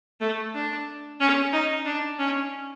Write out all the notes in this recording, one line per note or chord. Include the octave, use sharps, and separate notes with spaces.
A3
D4
C#4
D#4
D4
C#4